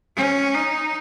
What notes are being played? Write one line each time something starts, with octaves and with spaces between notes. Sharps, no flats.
C#4
D#4